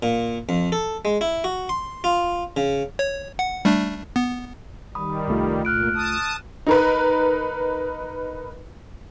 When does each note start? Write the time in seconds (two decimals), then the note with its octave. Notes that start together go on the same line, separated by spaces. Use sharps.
0.03 A#2
0.49 F2
0.72 A4
1.05 G#3
1.21 E4
1.44 F#4
1.69 C6
2.04 F4
2.57 C#3
2.99 C#5
3.39 F#5
3.65 G3 A3 D4
4.16 B3
4.95 D#3 G3 B5 D#6
5.28 C2 A3 F4
5.65 A#2 F6 F#6 D7
5.95 A5 D#6
6.67 D#4 A#4 B4